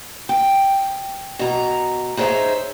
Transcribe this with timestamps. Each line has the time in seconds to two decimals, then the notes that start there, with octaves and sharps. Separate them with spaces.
0.29 G5
1.39 B2 A#5
2.17 D#4 G#4 C5 C#5 E5